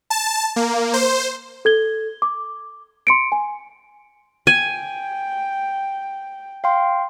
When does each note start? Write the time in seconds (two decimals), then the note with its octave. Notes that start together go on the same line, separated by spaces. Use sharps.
0.10 A5
0.56 A#3
0.93 C5
1.65 A4 G#6 G7
2.22 D6
3.07 C6 C#7 D7
3.32 G#5
4.47 G5 G#5
6.64 F5 G5 C6